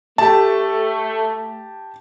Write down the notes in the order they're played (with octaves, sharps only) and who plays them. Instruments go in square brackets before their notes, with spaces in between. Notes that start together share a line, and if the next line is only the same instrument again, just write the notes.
[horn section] A3 [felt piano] G4 A5